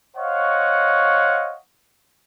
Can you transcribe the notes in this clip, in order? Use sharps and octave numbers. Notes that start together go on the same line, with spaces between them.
C5 C#5 D#5 F5 F#5 C#6